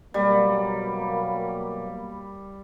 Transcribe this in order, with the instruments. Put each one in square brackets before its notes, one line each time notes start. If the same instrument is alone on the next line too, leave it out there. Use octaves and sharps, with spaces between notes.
[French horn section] B2 F#3 A#3 [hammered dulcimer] G3